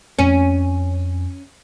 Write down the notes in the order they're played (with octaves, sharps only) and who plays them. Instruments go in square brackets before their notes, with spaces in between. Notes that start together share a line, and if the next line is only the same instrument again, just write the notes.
[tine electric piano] F2 [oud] C#4